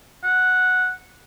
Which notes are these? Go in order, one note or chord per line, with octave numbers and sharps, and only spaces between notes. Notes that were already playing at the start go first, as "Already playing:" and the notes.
F#5